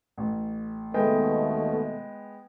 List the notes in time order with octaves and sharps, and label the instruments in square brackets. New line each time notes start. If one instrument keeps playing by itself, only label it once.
[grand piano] A1
[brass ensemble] D#2 B2 A3 [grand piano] G#3 B3 G5